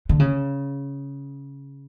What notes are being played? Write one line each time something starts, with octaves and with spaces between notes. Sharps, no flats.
D3
C#3